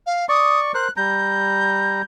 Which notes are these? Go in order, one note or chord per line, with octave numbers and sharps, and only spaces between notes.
F5
D5 C#6 D#6
A#4 C5 F#6
G3 A#5 G6